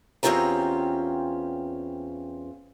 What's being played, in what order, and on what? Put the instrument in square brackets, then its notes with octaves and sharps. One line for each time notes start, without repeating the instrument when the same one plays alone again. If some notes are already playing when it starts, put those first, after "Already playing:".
[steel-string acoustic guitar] E2 C4 C#4 F4 G4 A#5